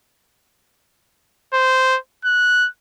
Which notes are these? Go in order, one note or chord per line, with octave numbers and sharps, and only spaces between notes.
C5
F#6